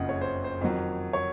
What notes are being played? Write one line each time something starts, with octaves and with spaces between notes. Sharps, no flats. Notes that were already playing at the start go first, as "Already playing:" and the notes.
Already playing: F#1 F2 C#3 D#5 F#5
C#5
C5
C5
F2 D#3 F#3
C#5